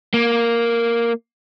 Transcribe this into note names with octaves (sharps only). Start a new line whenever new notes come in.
A#3